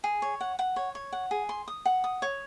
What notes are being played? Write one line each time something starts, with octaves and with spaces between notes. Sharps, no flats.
G#4
C#5
F#5
F#5
C#5
C#5
F#5
G#4
C6
D#6
F#5
D#6
C#5